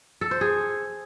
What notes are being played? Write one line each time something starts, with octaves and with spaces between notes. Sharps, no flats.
A4
C5
G#4